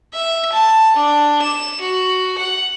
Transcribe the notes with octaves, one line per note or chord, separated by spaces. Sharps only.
E5
A5
D4
E7
F#4
F#5